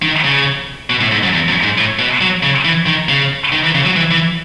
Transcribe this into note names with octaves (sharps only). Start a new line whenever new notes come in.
D#3
C#3
B2
A2
G#2
F#2
E2
F#2
G#2
A2
B2
F#3
C#3
E3
D#3
C#3
D#3
E3
C#3
F#3
E3
E3